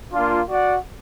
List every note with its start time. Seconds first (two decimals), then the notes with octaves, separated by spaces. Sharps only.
0.13 A#3 D4 F4
0.49 F#4 D5 F#5